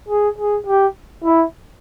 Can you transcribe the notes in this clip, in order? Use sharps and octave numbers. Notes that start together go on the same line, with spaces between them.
G#4
G#4
G4
E4